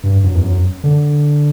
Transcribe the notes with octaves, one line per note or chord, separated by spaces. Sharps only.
G2
F#2
E2
F#2
D3